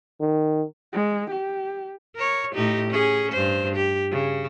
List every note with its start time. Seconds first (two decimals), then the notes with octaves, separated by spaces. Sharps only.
0.20 D#3
0.93 G#3
1.31 G4
2.16 A#4 C#5
2.54 A2 D#4 G4
2.90 C#4 G#4
3.32 G2 C5
3.76 G4
4.11 C#3